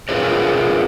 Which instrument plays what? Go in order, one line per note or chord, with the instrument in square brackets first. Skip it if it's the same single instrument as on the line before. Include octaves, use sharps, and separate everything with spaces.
[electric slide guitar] F4 G#4 A#4 B4 C#5